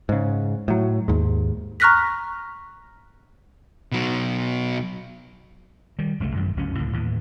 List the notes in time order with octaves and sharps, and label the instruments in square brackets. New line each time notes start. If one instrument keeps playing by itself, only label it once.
[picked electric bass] G#2 C#3
A2 F#3
D#2 G#2
[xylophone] A#5 C#6 F6 F#6 A#6 B6
[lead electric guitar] B2 F#3
[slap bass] D#3 G3
F#1 C2 G#3 A3
A1 F#2 D#3
F#1 D2 G#2 C#4
C#2 A2 D3
D#2 A2 E3